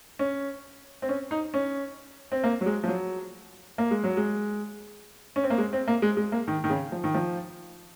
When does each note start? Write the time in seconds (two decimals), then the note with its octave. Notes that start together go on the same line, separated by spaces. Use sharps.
0.19 C#4
1.02 C4
1.09 C#4
1.31 D#4
1.54 C#4
2.32 C4
2.44 A#3
2.61 F#3
2.66 G#3
2.84 F3
2.88 F#3
3.78 A#3
3.91 G#3
4.04 F#3
4.17 G#3
5.36 C#4
5.44 C4
5.50 A#3
5.58 G#3
5.73 C4
5.88 A#3
6.02 G#3
6.17 G#3
6.32 A#3
6.48 D#3
6.64 D#3
6.70 C#3
6.92 F3
7.04 D#3
7.15 F3